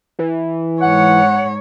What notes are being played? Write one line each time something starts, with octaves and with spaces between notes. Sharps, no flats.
E3
G#2 C#5 F#5